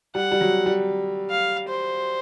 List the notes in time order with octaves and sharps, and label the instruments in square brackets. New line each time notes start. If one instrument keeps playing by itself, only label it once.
[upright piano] G3 [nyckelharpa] F#5
[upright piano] G3
F#3
G3
[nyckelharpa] F5
C5